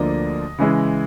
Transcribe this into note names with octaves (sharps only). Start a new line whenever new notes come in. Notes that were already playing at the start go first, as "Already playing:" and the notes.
Already playing: D2 D3 F3 A#3 D4 D#5
C#3 E3 G#3